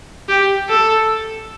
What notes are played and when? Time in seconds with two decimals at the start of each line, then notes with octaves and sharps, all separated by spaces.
0.29 G4
0.69 A4